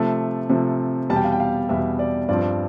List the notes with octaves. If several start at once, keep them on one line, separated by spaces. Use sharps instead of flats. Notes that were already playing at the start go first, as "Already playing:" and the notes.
Already playing: C3 F3 A3 A5
C3 F3 A3
E2 B2 G3 A5
G5
F5
G5
F5
E2 B2 G3 E5
D5
G2 F3 C4 D5